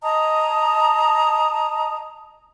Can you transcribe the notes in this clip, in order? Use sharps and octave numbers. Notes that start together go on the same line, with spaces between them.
D#5 A5 A#5 D#6